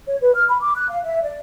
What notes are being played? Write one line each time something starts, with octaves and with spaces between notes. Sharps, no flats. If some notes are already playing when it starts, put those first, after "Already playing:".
C#5
B4
F6
B5
D6
F#6
F5
E5
D5